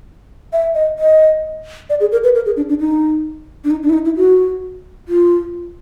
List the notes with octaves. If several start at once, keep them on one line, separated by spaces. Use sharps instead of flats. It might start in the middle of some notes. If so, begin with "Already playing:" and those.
E5
D#5
D#5
D5
G#4
A#4
B4
A#4
G#4
D4
D4
D#4
D4
D#4
D4
E4
D#4
E4
F#4
F4